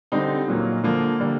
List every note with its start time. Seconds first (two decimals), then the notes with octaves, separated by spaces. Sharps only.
0.12 D3 G3 C4 D#4
0.48 A#2 F#3 A#3
0.84 D3 F3 A#3
1.20 D3 G3 A#3